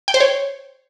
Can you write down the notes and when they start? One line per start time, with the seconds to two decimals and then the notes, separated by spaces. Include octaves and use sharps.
0.08 G5
0.14 C5
0.20 C#5